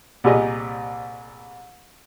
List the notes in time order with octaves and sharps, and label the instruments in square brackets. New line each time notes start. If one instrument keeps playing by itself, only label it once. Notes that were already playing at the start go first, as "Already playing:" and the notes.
[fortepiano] C2 A#2 G4 G#4 D#5